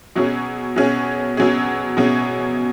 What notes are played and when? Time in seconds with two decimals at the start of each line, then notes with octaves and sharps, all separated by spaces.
0.16 B2 F#3 C#4 G#4
0.76 B2 F#3 C#4 G#4
1.37 B2 F#3 C#4 G#4
1.97 B2 F#3 C#4 G#4